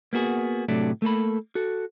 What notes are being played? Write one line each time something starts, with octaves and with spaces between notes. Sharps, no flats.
A#3 B3 F#4 G#4
A2 C3 F#3 A3 D4
A3 A#3 A4 B5
F#4 A4